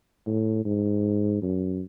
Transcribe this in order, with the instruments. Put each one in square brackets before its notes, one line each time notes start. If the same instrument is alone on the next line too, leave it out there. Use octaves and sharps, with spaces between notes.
[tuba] A2
G#2
F#2